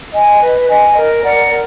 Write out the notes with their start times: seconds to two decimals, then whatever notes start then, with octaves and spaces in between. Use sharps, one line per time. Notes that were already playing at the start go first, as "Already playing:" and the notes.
0.13 D#5 G#5
0.40 B4
0.67 D#5 G#5
0.95 A#4
1.22 D5 F#5 A#5
1.49 A#4